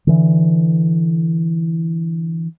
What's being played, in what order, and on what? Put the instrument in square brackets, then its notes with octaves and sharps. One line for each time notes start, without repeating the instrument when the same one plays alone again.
[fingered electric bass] D3 E3